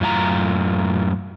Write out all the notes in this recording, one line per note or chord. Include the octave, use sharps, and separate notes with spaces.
F#2 A2 F4 A5 A#5